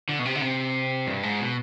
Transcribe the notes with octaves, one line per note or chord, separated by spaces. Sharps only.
D3
B2
C3
D3
C3
G2
G#2
B2